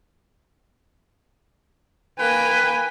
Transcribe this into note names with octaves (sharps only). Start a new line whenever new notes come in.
A#3 B4 G5 G#5